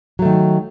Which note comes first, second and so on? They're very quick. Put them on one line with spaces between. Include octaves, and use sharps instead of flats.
F#3 A3 D#3